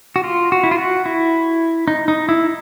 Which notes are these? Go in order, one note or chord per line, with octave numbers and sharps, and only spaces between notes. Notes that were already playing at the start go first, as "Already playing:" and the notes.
F#4
F4
F#4
E4
F4
F#4
E4
D#4
D#4
E4